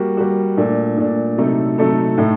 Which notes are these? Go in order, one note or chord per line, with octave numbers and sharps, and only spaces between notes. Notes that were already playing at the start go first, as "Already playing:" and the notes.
Already playing: G3 A#3 F#4
G3 A#3 F#4
A#2 A3 D4
A#2 A3 D4
C3 F#3 A3 D#4 A4
C3 F#3 A3 D#4 A4
A2 A3 D#4